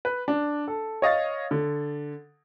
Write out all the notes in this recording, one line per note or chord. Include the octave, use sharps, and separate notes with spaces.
B4
D4
A4
C#5 D#5 F5 A6
D3